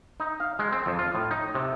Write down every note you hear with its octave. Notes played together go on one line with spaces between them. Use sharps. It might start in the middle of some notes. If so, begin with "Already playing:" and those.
D#4
F5
G#3
C4
F2
F4
A2
D#4
C3